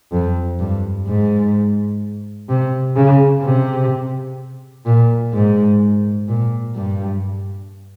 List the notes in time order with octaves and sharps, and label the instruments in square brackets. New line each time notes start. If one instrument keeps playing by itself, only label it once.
[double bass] F2
G2
G#2
C3
C#3
C3
A#2
G#2
A#2
G2